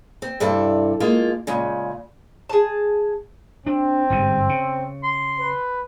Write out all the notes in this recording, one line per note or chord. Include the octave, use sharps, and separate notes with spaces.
C4
G2 C3 E4 A4 D5
G#3 A#3 F4
A#2 C#3 G#3
G#4 A5
C4 D4
G1 G#2 C3
C#3
C6
B4